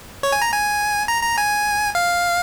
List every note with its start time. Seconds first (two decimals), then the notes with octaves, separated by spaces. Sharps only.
0.23 C#5
0.32 G#5
0.42 A#5
0.52 G#5
1.08 A#5
1.23 A#5
1.38 G#5
1.95 F5